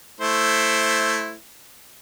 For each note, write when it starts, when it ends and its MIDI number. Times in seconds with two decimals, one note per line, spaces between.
0.21 1.35 57
0.21 1.35 64
0.21 1.35 72